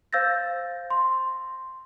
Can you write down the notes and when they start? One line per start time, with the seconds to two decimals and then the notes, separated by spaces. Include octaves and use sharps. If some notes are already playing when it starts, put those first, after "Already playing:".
0.13 C5 F5 E6 G6 A6 A#6
0.90 C6